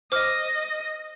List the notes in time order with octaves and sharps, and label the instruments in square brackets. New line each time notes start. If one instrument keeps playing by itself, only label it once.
[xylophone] C5 D6 F6 [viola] D#5